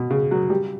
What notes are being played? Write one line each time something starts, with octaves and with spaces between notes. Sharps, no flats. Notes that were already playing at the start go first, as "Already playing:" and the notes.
Already playing: B2
C#3
F#3
G3